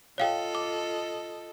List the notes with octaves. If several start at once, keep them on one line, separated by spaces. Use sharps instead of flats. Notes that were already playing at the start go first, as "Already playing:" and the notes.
F4 A4 C#5 D#5 F5 G5
D6